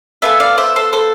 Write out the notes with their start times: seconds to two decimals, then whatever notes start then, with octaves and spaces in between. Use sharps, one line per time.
0.22 B3 D4 F4 A4 E5 G#5
0.40 D5 F5
0.58 C5 E5
0.76 A4 C5
0.93 A4 C5